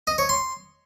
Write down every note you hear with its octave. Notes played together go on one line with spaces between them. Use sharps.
D#5
C#5
C6